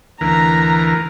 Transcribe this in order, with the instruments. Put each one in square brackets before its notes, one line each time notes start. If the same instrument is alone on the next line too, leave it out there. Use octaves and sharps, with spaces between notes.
[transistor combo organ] D2 E3 A#4 [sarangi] A#5